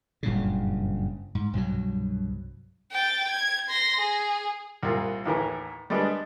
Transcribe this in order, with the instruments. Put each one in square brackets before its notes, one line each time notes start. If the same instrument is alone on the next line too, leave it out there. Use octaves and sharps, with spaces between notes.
[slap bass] F#1 G2 A#2 C#3
G#2
C2 G2 B2 F#3
[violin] G5 A6
G#6
C6 A#6
G#4
[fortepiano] C2 A#2
D#2 A2 E3 A#4
G3 G#3 B3 D4